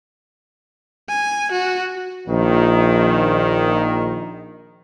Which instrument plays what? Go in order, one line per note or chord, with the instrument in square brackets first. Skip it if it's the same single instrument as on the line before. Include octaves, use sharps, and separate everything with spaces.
[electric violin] G#5
F#4
[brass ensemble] A#1 D#3